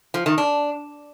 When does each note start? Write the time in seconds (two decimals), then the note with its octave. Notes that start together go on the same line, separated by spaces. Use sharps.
0.14 F3
0.26 D#3
0.38 D4